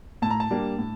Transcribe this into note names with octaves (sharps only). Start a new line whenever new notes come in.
A2 A5
A#5
A5
G3 A#3 D4
A2